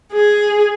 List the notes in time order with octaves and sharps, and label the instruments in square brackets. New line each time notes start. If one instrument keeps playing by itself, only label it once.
[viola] G#4